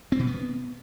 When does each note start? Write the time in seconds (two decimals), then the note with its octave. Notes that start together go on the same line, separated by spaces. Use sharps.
0.12 C4
0.19 B2
0.27 B3